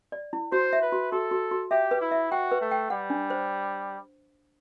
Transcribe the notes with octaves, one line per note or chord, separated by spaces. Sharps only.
D5
E4
F#4 C5
E5
B4
F#4
F#4 A4
F#4
F#4
G4 E5
B4
E4
E5
F#4 G5
B4
A3
G5
G3 F#5
D4
C5